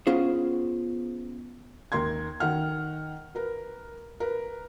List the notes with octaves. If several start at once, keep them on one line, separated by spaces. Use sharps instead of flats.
B3 C#4 F4 G#4 C5
D#2 A#4 C6 G#6
D#3 F#5 F6
A#4 B4
A#4 B4